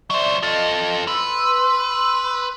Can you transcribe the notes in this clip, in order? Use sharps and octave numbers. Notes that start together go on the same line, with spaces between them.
F#3 C5 D5 E5
F4 A4 D#5
B4 C6 E6